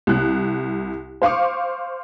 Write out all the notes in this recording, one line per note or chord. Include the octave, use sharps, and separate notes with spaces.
C2 F#6
C5 F5 C#6 D6